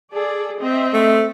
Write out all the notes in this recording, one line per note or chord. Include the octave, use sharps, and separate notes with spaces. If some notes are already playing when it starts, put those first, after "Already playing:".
G#4 A4 D5
C4 D#5 E5
A3